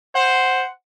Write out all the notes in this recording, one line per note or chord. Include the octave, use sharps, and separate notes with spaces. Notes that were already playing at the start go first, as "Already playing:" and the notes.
C5 F#5